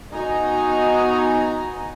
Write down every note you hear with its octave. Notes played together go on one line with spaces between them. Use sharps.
B3 D#4 F#4 G#5 A#5